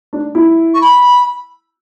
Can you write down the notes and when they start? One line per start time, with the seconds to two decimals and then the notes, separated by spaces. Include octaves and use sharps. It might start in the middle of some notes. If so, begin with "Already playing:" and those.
0.13 D4
0.35 E4
0.74 C#6
0.81 B5